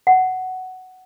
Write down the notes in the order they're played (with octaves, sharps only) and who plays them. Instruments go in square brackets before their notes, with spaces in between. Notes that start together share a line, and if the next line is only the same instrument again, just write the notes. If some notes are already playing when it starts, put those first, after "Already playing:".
[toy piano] F#5